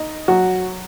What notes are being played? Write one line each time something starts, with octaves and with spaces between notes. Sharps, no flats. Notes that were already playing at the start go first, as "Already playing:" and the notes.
Already playing: D#4 D#5
F#3 F#4